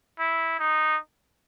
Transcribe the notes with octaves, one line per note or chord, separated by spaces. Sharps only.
E4
D#4